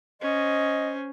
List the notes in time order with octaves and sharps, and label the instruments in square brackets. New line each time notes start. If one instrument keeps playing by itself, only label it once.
[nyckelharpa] C#4 C5 [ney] D#5